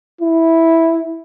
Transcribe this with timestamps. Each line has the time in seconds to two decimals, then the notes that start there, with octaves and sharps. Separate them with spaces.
0.21 E4